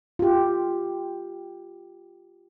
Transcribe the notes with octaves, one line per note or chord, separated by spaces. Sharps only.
F4 G4